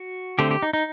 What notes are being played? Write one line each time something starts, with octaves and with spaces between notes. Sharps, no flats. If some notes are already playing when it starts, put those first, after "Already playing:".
Already playing: F#4
D3 A3 C4 G4
G4
D#4
D#4